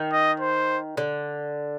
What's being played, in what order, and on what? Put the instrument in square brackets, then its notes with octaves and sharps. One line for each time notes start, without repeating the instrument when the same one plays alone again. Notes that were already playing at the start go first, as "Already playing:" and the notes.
Already playing: [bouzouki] D#3
[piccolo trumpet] D#5
C5
[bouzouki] D3